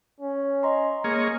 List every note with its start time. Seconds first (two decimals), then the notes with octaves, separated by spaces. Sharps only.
0.21 C#4
0.63 D#5 A#5 C6
1.04 G#3 A#3 G#4 C#5